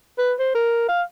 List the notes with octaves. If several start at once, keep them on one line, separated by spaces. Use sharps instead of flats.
B4
C5
A#4
F5